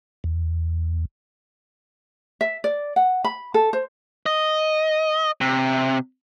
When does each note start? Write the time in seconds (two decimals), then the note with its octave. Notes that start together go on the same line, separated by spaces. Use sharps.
0.24 E2
2.41 E5
2.64 D5
2.96 F#5
3.24 B5
3.54 A4
3.73 C5
4.26 D#5
5.41 C3